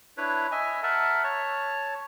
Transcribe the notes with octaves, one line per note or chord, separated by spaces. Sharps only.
D4 E4 B4 C#5
D#5 E5 G#5
A#4 E5 F#5 A5
C#5 A5